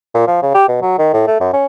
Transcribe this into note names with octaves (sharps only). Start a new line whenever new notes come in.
A#2
F3
C#3
G4
B2
F#3
D#3
A2
A3
F#2
C#4